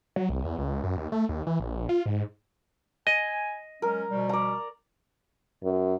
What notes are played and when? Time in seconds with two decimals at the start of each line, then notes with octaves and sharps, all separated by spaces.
0.16 F#3
0.29 C2
0.44 E2
0.58 C#2
0.84 F#2
0.97 D#2
1.12 A3
1.29 D#2
1.47 E3
1.60 A#1
1.89 F4
2.06 G#2
3.07 D#5 G#5
3.82 F#3 G#3 C#4 A#4
4.10 B2 F3 G3
4.29 D5 A#5
5.64 F#2